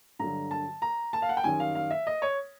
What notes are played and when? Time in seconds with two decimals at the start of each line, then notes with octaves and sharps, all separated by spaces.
0.19 G2 D3 F#3 A#5
0.51 A5
0.82 A#5
1.13 A5
1.22 F5
1.29 F#5
1.37 G5
1.44 F#2 D#3 G3 G#5
1.60 F5
1.75 F5
1.90 E5
2.07 D#5
2.22 C#5